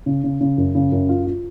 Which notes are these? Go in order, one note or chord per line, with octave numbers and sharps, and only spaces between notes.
C#3
C#3
C#3
F#2
C#3
F#2
F4
F4